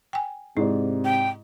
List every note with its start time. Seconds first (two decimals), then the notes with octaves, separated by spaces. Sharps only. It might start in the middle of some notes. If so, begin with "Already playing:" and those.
0.13 G5 G#5
0.57 G#2 C3 E4 D5
1.05 G5